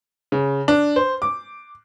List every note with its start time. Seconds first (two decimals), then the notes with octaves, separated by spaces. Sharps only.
0.32 C#3
0.68 D4
0.96 C5
1.22 D6